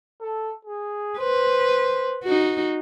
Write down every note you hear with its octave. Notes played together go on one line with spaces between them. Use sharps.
A4
G#4
B4 C5
D#4 F#4